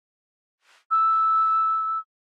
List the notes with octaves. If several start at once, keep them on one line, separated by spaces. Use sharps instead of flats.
E6